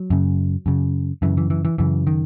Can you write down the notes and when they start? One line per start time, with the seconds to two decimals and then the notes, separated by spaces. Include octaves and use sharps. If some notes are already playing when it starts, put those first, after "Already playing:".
Already playing: F#3
0.10 F#2 C#3
0.66 F#2 C#3
1.22 F#2 C#3 E3
1.37 E3
1.50 E3
1.65 E3
1.78 F#2 C#3 E3
2.07 D#3